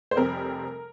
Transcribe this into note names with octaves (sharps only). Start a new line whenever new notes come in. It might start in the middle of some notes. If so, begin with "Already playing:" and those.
C5
F1 F2 C3 G3 C4 A#4